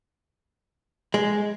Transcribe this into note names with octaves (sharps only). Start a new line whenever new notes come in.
G#3